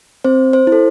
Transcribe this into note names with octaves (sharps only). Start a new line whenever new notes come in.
C4 C5
C5
E4
A4